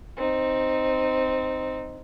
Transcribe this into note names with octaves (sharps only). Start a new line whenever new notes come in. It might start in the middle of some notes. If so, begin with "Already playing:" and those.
C4 D#4